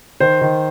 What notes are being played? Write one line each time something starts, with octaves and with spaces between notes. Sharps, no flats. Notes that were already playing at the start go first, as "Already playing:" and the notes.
D#3 C5
D#3